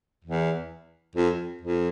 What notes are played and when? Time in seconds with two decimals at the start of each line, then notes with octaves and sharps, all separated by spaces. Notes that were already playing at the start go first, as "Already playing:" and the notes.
0.24 E2
1.15 F2
1.61 F2